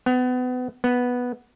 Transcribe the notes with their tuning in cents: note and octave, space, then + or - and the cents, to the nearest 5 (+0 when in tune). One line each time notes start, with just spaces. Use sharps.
B3 +30
B3 -5